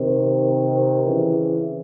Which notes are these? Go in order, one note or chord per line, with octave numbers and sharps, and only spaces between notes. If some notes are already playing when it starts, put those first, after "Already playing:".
Already playing: C3 D#3
C#3 E3